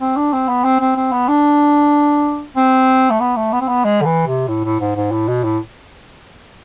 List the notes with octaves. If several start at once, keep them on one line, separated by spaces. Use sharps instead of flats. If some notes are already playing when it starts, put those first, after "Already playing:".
C4
D4
C4
B3
C4
C4
C4
B3
D4
C4
A3
B3
A3
B3
C4
B3
G#3
D3
E3
C3
A2
A2
G#2
G#2
A2
B2
A2